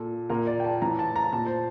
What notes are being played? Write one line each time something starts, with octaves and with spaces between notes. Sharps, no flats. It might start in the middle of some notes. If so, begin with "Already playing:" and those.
Already playing: A#2 A4
A#2 A#4
D5
G5
A5
A2 E3 A#5
A5
A#5
A#2 A5
C5